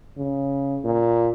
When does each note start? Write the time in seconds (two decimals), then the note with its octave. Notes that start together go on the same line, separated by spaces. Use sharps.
0.17 C#3
0.85 A#2